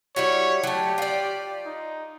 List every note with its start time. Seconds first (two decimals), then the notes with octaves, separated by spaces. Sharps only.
0.16 G3 E4 F#4 C#5
0.63 F#3 A3 G4
0.98 F4 D5
1.66 D#4